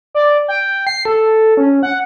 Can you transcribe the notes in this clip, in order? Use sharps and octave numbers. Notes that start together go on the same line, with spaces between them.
D5
G5
C7
A4
C#4
F#5